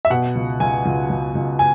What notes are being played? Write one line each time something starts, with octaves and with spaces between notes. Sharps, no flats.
E5
B2 F#5
C#2
C#2 G#5
C#2
C#2
C#2
G#5